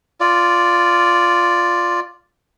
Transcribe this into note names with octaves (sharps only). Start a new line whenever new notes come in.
F4 D5